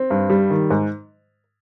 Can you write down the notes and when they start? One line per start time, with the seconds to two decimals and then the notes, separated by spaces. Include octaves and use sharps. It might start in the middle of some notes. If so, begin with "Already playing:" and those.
Already playing: C4
0.10 G2
0.30 G3
0.50 D#3
0.70 G#2